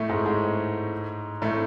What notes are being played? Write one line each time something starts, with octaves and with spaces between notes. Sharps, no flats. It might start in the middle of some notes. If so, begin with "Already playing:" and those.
Already playing: A2 A3
G#2 G#3
G#2 G#3
A2 A3